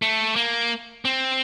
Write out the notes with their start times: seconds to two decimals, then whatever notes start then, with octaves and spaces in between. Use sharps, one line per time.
0.02 A3
0.36 A#3
1.05 C4